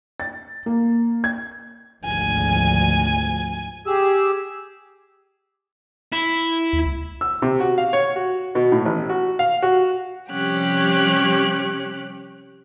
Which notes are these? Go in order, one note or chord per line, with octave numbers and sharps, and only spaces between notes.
A6
A#3
G#6
G#1 D2 F3 G#5
G4 G#4 E6
E4
D#2
C#2
E6
C3
F#4
F5
C#5
F#4
B2
A2
A1
F#4
F5
F#4
C3 F3 G3 C#4 G4 F#6